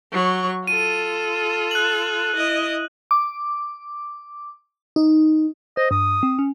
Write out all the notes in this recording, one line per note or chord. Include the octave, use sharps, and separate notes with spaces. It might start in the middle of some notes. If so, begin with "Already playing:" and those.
F#3 C#6
F4 A4 D#7
F#6 F#7
E4 D#5
D6
D#4
C5 D#5
G2 D#6
C4
C#4